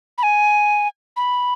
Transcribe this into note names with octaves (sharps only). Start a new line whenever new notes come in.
B5
G#5
B5